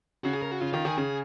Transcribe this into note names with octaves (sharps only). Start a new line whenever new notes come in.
C#3 F#4
G#4
A#4
F#4
C#3 F4
D#3 F4
D#3 G#4
C#3 G#4